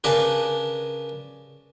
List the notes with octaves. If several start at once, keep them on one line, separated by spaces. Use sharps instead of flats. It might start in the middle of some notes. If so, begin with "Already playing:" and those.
C#3 D4 A#4 B4